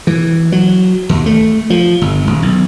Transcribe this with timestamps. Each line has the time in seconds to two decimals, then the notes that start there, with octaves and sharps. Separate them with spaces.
0.07 E3
0.52 F#3
1.09 D#2
1.26 A3
1.70 F3
2.01 G1
2.27 G#1
2.42 B1